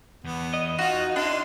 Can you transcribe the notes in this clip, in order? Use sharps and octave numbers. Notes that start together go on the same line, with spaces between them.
E2 B3
D#5
D#4 F4 F#4
D4 E4 F5 C6